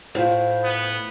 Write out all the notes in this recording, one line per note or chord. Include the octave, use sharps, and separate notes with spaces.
A2 E4 F4 C5
B3